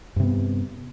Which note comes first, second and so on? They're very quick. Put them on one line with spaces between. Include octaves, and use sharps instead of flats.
G2 C3 B3